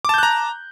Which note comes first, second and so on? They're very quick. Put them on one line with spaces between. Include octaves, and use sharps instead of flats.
D6 A5 G6 F#6 A#5